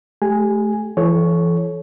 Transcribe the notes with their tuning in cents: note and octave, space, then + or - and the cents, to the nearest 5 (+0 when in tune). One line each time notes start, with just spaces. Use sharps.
A3 -30 G4 +5 G#5 +0
E3 +35 A4 -30 C#5 +0